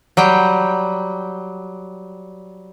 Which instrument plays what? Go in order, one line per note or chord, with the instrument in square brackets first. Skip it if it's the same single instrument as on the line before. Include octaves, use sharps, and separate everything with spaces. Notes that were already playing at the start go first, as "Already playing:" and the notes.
[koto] F#3 G3 G5